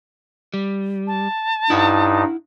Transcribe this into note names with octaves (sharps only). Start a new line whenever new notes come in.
G3
A5
G2 D#4 E4 F#5